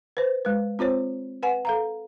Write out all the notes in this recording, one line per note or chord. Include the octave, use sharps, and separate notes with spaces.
B4 C5
G#3 B4
C4 F4 C5 C#5
B4 F#5 G#5
A4 F5 A#5